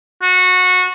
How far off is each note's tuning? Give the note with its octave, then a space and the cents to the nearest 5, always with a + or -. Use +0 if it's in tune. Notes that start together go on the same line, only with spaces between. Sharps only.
F#4 -20